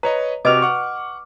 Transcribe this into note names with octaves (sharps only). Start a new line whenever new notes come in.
B4 C#5 D#5 A#5
C3 F#4 B4 D#5 D6 F6
F#5 C#6